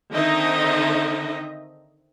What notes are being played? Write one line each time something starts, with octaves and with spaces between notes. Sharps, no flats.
D3 D#3 C4 D#4 D#5 E5